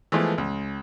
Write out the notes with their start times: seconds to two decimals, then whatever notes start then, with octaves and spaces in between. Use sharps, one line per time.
0.12 E3 F3 G#3 A3 B3
0.38 C#2